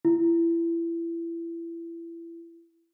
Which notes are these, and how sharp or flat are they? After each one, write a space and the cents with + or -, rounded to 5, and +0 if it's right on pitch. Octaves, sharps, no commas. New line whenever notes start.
E4 +25